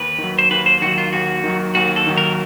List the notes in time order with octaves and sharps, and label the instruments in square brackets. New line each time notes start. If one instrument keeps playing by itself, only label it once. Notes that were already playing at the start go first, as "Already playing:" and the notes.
Already playing: [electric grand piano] D#2 [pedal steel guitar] B4
[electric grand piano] D#3 F#3
[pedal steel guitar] C5
[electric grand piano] D#2 [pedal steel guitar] B4
[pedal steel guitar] C5
[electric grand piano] D#3 F#3 [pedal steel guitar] F#4
[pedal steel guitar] F4
[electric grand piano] D#2 [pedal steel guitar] F#4
[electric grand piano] D#3 F#3
[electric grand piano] D#2 [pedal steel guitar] F#4
[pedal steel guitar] A4
[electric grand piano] D#3 F#3
[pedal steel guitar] A#4